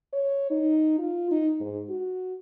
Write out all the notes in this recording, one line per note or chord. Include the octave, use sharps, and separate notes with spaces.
C#5
D#4
F4
D#4
G#2
F#4